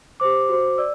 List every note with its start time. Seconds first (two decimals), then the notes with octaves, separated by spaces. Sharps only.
0.20 G4 C5 D6
0.49 F#4 C5
0.78 D5 E6